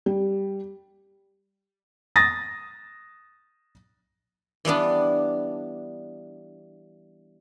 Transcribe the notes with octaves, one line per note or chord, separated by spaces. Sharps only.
G3
D#6 A6 A#6
E3 G3 B3 D4